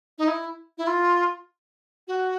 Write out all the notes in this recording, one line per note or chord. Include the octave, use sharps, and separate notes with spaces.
D#4
E4
E4
F4
F#4